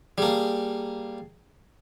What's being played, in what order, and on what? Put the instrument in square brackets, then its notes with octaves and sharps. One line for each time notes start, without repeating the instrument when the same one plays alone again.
[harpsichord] G3 A#3 [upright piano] G#4 A5